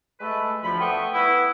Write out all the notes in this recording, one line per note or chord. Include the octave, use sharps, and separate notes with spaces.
G#3 A3 B4
D2 F3 B5
A3 B3 B4 G5 C#6 D#6
B3 E4